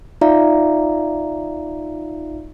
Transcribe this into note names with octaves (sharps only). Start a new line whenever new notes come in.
D#4 F4 D5 E5 F5 A#5